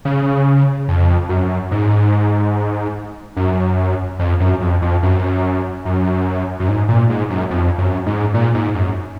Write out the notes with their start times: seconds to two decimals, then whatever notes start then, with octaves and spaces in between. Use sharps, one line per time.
0.05 C#3
0.88 F2
1.29 F#2
1.71 G#2
3.36 F#2
4.19 F2
4.40 F#2
4.61 F2
4.82 F2
5.03 F#2
5.85 F#2
6.60 F#2
6.68 G#2
6.89 A#2
7.09 G#2
7.30 F#2
7.51 F2
7.78 F#2
8.06 G#2
8.34 A#2
8.55 G#2
8.75 F#2